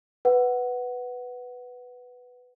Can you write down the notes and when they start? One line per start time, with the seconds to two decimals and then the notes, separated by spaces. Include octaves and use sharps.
0.25 B4 F#5